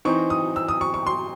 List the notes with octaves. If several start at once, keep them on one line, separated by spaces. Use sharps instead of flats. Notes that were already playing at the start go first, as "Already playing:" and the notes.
E3 C4 D#4 C#6
D#6
E6
D#6
C#6
C#6
C6